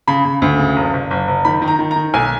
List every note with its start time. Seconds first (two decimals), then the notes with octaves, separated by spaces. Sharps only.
0.07 C#3 B5
0.25 C#3
0.42 D2
0.59 C#3
0.76 F#1
0.93 F#1
1.11 F#1
1.28 F#1
1.45 D#3 B5
1.62 D#3
1.68 A#5
1.79 D#3
1.91 A#5
1.96 D#3
2.14 B1 G#5